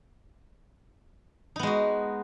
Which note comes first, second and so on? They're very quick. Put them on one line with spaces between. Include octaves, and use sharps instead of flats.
D#4 B3 G#3 F#4